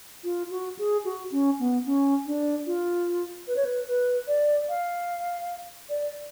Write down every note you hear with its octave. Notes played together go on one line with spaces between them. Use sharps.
F4
F#4
G#4
F#4
C#4
B3
C#4
D4
F4
B4
C#5
B4
B4
D5
F5
D5